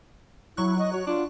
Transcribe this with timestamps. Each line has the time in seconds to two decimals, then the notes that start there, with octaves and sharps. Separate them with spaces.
0.57 F#3 E4 C#6 F#6
0.79 D#5
0.93 F#4 C#5
1.07 D4 F4